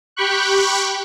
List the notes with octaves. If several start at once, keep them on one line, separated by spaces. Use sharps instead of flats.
G4 G5 B5 C#6 F#6